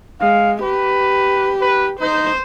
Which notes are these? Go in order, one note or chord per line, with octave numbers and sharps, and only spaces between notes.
G#3 F5
G4 B4
B4
D#4 C5